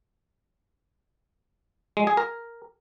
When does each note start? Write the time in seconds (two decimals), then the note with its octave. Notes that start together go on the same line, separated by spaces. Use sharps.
1.97 G#3
2.07 G#4
2.17 A#4